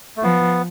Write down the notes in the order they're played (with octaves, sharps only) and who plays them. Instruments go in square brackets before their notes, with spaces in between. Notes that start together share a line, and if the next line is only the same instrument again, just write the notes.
[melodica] A3
[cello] F3 [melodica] B3